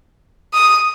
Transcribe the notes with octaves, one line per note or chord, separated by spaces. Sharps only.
D#6